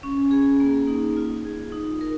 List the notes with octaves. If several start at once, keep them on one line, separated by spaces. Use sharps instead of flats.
C#4
G#4
A#3
D#4
F4
G#4
D#4
A#4